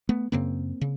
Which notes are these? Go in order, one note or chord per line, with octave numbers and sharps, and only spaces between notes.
A3 B3
F#2 C#3 A#3 C4
C#3